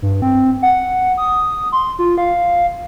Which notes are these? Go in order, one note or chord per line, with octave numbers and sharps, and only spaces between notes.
G2
C4
F#5
D#6
C6
F4
F5